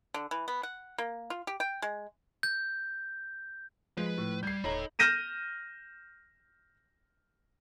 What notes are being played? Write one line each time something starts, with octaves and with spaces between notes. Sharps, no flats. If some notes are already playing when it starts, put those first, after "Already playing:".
D3
E3
B3
F#5
A#3
F4
G4
G5
G#3
G6
F3 G#3 B4
A2
G3 G6 G#6 C7
D#1 D#4 A4 C#5 A#5 B5 F#7
F6 G6 A#6 D#7 E7